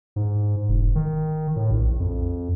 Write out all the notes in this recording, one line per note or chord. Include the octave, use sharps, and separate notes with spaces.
G#2
E1
D#3
A2
A#1
F2